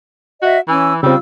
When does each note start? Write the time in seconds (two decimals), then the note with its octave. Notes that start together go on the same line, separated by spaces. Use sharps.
0.42 F#4 D#5 E5
0.68 E3 C#4 G#5 E6
1.03 C#3 G3 C4 F4 E6